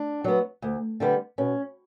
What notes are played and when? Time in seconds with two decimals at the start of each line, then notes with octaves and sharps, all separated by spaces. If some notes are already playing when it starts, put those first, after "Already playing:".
Already playing: D4
0.24 F#3 B3
0.62 D2
1.00 D3 G3 B3
1.38 B2 C#4